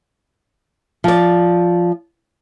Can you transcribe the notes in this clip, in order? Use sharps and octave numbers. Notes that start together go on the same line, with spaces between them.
F3 D5